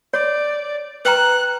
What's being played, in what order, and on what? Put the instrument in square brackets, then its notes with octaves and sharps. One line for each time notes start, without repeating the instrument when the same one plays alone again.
[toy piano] C#5 [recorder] D5
[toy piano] B4 G5 A#5 [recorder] F#6